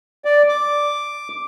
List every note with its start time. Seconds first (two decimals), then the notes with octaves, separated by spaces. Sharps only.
0.25 D5
0.49 D6